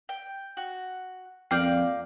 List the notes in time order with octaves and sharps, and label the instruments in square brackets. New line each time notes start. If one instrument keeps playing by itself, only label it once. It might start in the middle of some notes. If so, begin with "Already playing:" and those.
[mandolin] G5
F#4
[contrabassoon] F2 [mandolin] A#3 D5 F5 [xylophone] G5 F6 G6